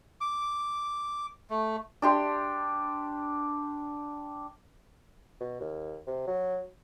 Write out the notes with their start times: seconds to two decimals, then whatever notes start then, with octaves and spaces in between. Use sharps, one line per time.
0.21 D6
1.50 A3
2.02 D4 G4 C6
5.40 B2
5.61 D#2
6.07 C3
6.27 F#3